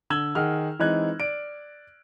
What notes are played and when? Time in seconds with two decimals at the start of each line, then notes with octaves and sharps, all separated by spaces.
0.10 D3 E6 G#6 F#7 G7
0.35 D#3 G#4 F#5 F6
0.79 E3 G#3 C4 D#4 F#6 G#6
1.20 D5 D7